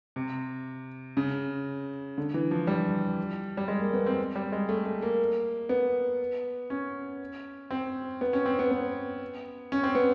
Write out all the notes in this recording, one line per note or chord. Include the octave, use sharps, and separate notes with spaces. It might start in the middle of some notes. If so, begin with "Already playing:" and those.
C3
C#3
D3
E3
F3
G3
G3
G#3
A#3
B3
C4
G3
G#3
A3
A3
A#3
B3
C#4
C4
B3
C#4
C4
B3
B3
C#4
C4
B3